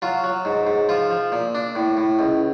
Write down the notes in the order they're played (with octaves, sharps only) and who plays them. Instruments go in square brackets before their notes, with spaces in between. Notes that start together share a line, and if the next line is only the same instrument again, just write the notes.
[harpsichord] F#3 F4
F#3
G#2
G#2
F3 F4
F3
A#2
D4
A2
A2
C#2